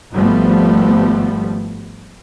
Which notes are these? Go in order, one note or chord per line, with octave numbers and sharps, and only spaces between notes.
G#1 F3 G3 A3 B3